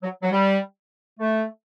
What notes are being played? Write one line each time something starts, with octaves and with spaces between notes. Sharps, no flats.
F#3
F#3
G3
A3